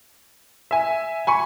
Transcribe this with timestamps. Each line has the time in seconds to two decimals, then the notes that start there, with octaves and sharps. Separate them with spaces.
0.71 E5 G#5
1.27 G#5 B5 C#6